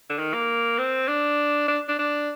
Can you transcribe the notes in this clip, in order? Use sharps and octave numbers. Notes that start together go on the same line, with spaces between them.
D3
D#3
A#3
C4
D4
D4
D4
D4